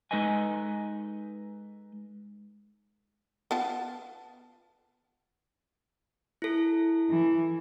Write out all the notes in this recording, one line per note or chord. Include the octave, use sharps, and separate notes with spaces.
G#3 D#4 A4 B4 D#5 G#5
B3 F4 A5
E4 A4
E3